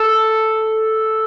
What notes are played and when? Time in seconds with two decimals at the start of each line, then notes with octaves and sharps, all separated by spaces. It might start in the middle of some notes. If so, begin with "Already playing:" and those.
Already playing: A4